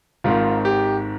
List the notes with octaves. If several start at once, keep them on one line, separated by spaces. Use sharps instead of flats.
G#1 G#2 D#3 F4
G4